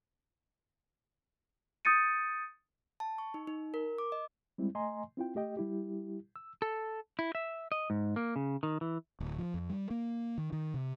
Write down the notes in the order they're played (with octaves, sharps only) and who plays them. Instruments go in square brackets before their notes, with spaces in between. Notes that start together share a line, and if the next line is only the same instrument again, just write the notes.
[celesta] D#6 G6 A6 C#7 D#7
[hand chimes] A5
C#6
D#4
D#4
A#4
D6
D#5
[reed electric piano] G3 G#3 C4 E4
A3 D#5 G#5 A#5 C6
C4 E4 F4 G5
A3 G4 D#5 G5
G3 E4 G4
E6
[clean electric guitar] A4
E4
E5
D#5
G#2
A#3
C#3
D#3
E3
[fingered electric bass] D1
F3
F2
G3
A#3
D#3
D#3
C3